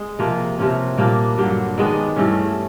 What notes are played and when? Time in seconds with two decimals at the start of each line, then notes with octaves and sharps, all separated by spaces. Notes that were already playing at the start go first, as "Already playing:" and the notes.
Already playing: G#3
0.19 C3 F3 A#3
0.59 C3 F3 A#3 C#4
0.98 A#2 G3 A#3 D4
1.38 G2 D3 F#3
1.78 D#3 G#3 B3 D4
2.16 G2 E3 A3 C#4